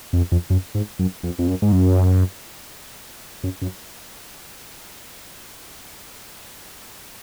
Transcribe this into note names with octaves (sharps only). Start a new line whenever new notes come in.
F2
F2
F#2
G#2
F#2
F2
F2
F#2
G#2
F#2
F#2
F#2